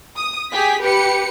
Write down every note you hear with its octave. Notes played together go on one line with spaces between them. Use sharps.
D#6
G4 G#4 B6
G4 B4 C#7